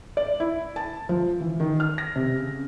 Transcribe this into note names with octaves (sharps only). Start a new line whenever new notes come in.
D5
E4
A5
F3
E3
D#3
F6
A#6
C3
C#3